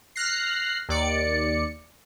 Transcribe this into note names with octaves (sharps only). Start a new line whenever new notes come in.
F6 F#6 A#6 C7
D#2 D5 C#7